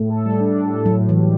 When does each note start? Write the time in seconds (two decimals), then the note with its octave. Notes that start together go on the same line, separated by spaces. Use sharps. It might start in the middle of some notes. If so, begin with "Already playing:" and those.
Already playing: A2 A3
0.10 A4
0.25 G3
0.40 D4
0.55 A2
0.70 A4
0.86 A2 F#3
1.00 A2
1.09 E3
1.17 G3